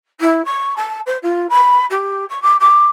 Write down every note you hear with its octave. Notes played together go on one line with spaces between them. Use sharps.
E4
C#6
A5
C5
F4
B5
G4
C#6
D6
D6